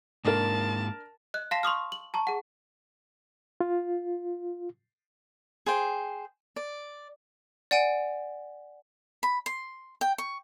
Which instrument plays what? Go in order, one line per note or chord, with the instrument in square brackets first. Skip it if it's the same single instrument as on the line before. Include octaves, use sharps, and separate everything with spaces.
[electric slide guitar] G#2 A#3 [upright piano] D4 A#4 [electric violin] A5
[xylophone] D#5 F#6
F5 A5 C6 A#6 C7 E7
C6 C#6 D#6 F6
F#7
A5 A#5 C#6
G#4 F#5
[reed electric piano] F4
[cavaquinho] G#4 C5 G5
D5
[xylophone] D5 F#5 G#5 D7
[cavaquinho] B5
C6
G5
C#6